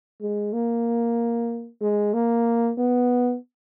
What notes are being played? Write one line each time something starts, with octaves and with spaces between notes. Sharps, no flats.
G#3
A#3
G#3
A#3
B3